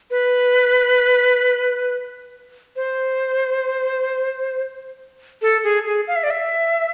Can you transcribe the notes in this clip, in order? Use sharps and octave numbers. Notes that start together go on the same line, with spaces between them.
B4
C5
A4
G#4
G#4
F5
E5
D5
E5